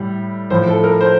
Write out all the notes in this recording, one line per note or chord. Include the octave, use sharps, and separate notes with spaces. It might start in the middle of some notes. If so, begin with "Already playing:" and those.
Already playing: A2 G3
A2 F3 C5
A4
A#4
C5